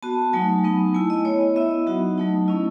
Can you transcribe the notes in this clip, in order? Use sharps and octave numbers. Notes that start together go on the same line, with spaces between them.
B3 F#4 A5
F#3 A3 D#4 G#5
F#3 B3 D#4
A3 E4 G#5
D#5
B3 E4 C#5
D#5
B3 E4 E5
D#5
F#3 B3 D#4 F#4
F#3 A3 D#4
A3 C#4 E4 D#5